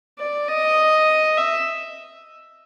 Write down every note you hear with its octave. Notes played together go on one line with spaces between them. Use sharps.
D5
D#5
E5